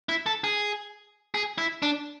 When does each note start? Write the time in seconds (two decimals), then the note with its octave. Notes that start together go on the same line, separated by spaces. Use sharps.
0.09 E4
0.26 A4
0.44 G#4
1.34 G#4
1.58 E4
1.82 D4